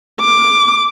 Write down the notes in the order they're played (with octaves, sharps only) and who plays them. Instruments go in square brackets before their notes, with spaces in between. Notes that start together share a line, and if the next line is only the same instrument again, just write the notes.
[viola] D6